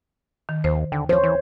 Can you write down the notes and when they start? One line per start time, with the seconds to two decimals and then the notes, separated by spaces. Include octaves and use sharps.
0.49 D#3
0.64 D#2 C5
0.92 D#2 D3
1.09 F3 C5 C#5
1.24 E3